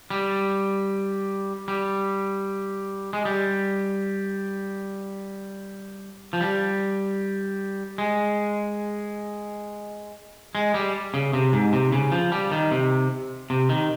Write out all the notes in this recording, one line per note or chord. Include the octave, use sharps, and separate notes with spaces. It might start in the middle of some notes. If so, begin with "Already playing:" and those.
G3
G3
G#3
G3
F3
G3
G#3
G#3
G3
C#3
C3
G#2
C3
C#3
F3
G3
D#3
C3
C3
D#3